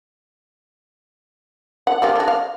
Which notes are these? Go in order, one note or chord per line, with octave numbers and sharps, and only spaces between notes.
F#5
G3 A#3 F4
D3 F#4
F5